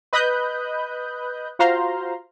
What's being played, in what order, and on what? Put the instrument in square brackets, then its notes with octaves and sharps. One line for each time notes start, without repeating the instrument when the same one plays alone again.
[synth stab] B4 D#5 B5 D#6 F#6 G6
F4 F#4 C5 F5 A#5 C6